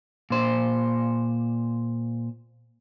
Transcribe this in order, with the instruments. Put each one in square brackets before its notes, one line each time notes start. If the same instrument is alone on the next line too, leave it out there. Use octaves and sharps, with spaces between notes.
[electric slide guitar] A#2 C5